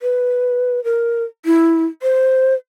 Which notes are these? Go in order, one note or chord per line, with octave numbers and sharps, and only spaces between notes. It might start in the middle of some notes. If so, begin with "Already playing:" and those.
B4
A#4
E4
C5